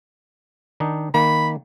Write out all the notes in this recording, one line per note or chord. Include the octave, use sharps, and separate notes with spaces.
D#3 D4 D#4
D#3 A#3 B5